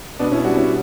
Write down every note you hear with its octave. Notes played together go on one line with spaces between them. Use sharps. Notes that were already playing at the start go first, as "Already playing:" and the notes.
B2 B3 D4
C#4 E4
G3 D4 F#4
C#4 E4